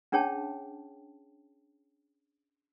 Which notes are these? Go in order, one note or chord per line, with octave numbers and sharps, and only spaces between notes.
C#4 D4 G#4 C#5 G5 A5